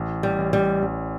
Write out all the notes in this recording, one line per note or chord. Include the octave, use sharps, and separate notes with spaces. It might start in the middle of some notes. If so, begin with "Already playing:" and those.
Already playing: A1
G3
A1
G3
A1